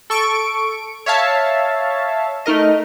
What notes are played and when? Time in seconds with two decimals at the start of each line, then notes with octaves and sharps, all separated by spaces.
0.10 A4 C#6 D7
1.06 C#5 E5 F5 A5
2.46 A3 D#4 A#4 D#5